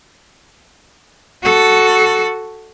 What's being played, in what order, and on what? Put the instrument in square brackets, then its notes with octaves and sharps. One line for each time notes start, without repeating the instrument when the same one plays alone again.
[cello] F#4 A4